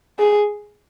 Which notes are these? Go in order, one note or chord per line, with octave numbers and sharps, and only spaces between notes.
G#4